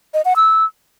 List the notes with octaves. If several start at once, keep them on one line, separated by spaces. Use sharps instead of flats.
D#5
F#5
E6